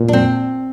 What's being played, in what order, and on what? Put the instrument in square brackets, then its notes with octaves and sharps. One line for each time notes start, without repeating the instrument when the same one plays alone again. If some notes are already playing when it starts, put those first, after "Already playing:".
Already playing: [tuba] A#2
[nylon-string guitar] D4
C4